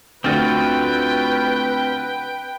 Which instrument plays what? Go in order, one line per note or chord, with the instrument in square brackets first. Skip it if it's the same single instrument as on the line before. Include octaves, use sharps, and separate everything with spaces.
[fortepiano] D2 [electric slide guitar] C4 F4 F#4 [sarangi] B4 [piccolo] G5